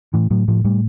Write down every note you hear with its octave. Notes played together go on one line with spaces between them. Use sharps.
A2 E3
A2 F#3
A2 F3
A2 G3